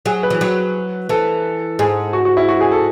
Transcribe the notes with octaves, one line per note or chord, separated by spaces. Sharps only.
F#3 G#4
B4
E3
F#3
E3 A4
G#2 G#4
F#4
F#4
E4
F#4
G#4
A4